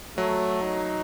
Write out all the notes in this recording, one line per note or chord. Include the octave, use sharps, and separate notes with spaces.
F#3 A3
D#4